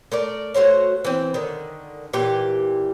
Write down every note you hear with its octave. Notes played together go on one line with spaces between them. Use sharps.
A3 A#4 D5
A3 F#4 C5 C#5
E3 C4
D3 D#3
A#2 E3 G4